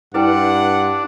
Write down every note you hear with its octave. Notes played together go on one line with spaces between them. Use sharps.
G2 D4 E4 B4 F#5 G5